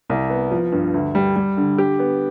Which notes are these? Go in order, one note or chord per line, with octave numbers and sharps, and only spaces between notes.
C2
B3
F3
G2
D2
G3
G3
D3
G4
B3